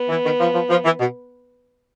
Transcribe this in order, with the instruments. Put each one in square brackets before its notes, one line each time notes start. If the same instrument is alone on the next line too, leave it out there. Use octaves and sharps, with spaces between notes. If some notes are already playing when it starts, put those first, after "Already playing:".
Already playing: [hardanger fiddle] B3
[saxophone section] E3
D#3
F3
F3
F3
E3
B2